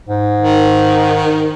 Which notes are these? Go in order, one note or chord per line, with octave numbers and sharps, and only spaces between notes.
G#2
D#3